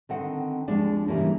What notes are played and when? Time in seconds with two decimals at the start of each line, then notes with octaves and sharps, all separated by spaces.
0.09 D3 D#3 C4 F#5
0.68 D#2 F3 G#3 D4
1.08 C#3 E3 F#3 G3 A#3